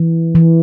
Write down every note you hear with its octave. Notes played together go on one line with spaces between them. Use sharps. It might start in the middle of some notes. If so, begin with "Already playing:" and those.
Already playing: E3
E3